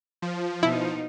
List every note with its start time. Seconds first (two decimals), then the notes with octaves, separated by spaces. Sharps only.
0.22 F3
0.63 B2 D#4 E4